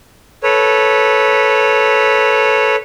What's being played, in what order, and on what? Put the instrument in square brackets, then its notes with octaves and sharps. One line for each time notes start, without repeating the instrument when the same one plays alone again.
[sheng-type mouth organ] A4 B4 C#5